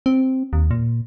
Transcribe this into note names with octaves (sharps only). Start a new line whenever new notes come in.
C4
D#2
A#2